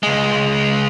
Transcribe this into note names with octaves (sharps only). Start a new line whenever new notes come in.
C#2 G#3